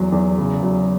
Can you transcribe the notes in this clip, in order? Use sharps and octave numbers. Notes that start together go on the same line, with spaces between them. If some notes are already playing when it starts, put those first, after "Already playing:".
Already playing: E2 F#3
E2
C#3
F#3